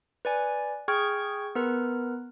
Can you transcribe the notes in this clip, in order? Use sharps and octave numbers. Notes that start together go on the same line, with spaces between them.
B4 D5 G#5
G#4 G5 C#6 F6 G#6
B3 A#4 B4